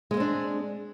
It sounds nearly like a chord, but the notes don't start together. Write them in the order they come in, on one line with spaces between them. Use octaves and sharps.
G#3 A#3 C4 D4